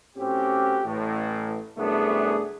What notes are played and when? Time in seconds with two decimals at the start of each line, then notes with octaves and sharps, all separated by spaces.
0.16 A2 C4 C#4 F#4 G4
0.84 A1 A2
1.78 C2 F#2 A3 B3 D4 G#4